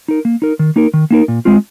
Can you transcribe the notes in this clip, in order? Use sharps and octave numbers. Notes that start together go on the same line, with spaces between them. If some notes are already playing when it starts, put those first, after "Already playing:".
D#4 A#4
A#3
D#4 A#4
D#3
A#3 D#4 A#4
D#3
A#3 D#4 A#4
A#2
G#3 C4 F4